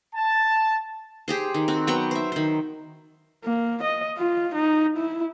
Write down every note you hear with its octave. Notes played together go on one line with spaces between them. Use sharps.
A5
G4 G#4 C5
D#3
C4 F#4
F#3 B3 G5 C#6
C5 E5
D#3 C5
A#3
D#5
F4
D#4
E4